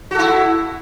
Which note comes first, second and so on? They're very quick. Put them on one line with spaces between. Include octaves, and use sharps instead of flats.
F#4 A4 E4